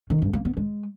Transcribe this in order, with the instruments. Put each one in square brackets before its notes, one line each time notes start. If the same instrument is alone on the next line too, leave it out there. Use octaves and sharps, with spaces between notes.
[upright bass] D#3
G2
A#3
B3
G#3